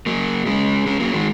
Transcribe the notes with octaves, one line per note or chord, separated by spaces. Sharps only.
F#3 A#3
G#3 C#4
G#3 C#4
F#3 A#3
D#3 G#3